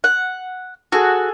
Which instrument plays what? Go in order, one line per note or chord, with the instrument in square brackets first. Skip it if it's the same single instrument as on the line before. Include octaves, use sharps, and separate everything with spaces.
[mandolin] F#5
[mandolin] F#4 [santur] G#4 A4